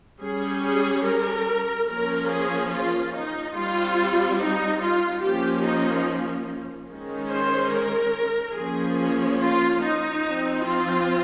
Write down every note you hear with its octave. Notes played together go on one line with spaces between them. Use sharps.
G3 C#4 G#4
G#4
A#4
F3 A#3 C#4 A#4
G#4
F4
D#4
G3 C4 F4
D#4
F4
F3 A#3 C#4 G4
D#4
D#3 G#3 C#4
C5
A#4
F3 A#3 C#4 G#4
F4
D#4
F3 C4
F4